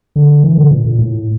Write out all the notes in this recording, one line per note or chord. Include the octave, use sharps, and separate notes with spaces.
D3
E3
D3
A#2
A#2
A2